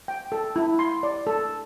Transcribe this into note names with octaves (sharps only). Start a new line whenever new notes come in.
G5
A4
E4
C6
D5
A4